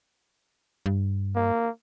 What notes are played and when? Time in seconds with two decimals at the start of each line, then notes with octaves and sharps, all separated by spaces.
0.86 G2
1.36 A#3